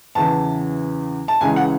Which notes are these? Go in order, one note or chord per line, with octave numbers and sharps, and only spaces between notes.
E2 C#3 E3 A5
A5
C#2 C#3 E3 G#5
F#5